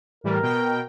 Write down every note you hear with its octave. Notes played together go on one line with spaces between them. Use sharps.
A2 E3 G3 A#4
B2 G5